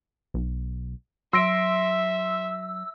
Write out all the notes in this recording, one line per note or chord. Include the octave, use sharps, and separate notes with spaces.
B1
F#3 E5 C6 E6 A#6 D7